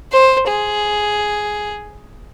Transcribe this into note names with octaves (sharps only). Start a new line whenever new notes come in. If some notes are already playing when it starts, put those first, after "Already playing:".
C5
G#4